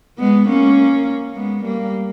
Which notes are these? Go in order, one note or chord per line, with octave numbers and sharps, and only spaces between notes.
G#3 B3
A#3 C#4
G#3 B3
G3 A#3